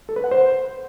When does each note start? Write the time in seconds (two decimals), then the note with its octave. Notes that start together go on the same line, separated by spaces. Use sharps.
0.09 A4
0.16 B4
0.24 F#5
0.31 C5